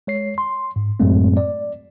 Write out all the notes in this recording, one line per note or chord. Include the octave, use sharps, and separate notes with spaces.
G#3 C#5 C7
C6
G#2
F#2 A2 F#3 G#3 A3 C4
D5